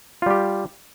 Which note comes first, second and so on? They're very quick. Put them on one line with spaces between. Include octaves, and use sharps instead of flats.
F4 G3 G4